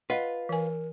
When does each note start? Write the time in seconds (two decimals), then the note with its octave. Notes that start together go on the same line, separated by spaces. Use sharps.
0.10 F4 B4 D#5 F#5
0.49 E3 A#4 G#5